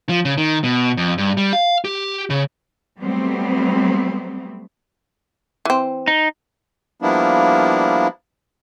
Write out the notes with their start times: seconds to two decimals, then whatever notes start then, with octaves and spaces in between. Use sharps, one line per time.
0.09 F3
0.25 C#3
0.38 D#3
0.64 B2
0.97 F2
1.18 G2
1.37 G3
1.53 F5
1.85 G4
2.30 C#3
3.00 F#3 G3 A3 B3 C4
5.65 E3 C4
6.08 D#4
7.02 F3 G3 A#3 B3 D4 E4